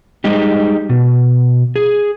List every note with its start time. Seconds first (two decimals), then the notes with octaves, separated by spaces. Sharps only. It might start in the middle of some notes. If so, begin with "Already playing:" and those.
0.24 G3 G#3 D#4 G4
0.89 B2
1.76 G#4